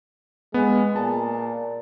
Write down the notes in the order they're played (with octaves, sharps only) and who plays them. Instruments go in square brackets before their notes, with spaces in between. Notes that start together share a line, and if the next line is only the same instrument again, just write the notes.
[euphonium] G#3 [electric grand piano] B3
[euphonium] A#2 [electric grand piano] A5